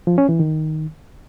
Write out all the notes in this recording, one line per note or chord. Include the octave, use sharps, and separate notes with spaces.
F3
C#4
E3
D#3